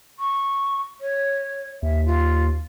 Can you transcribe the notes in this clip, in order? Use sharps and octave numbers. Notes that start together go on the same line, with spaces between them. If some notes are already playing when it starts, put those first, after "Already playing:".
C#6
C#5
D#2 E5
F4